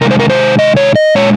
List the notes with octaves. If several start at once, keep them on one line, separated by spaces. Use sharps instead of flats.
C3 D#3 G#3 A#4
C5
A#4
C5
D#5
C#5
D#5
A#2 G#3 C#5